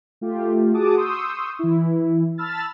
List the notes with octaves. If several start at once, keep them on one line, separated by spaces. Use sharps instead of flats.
A3 F4 G4
F#4 G#4 F#5 A5 D6 D#6
C6 C#6 D#6 E6 G6
E3 E4
A5 B5 E6 F6 A6